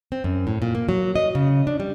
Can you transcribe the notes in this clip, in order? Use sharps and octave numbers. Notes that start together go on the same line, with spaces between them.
C4
F#2
A2
A#2
A#3
F#3
D#5
C#3
D4
G3